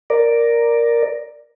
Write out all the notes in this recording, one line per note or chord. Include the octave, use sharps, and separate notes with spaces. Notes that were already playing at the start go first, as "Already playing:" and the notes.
A#4 D5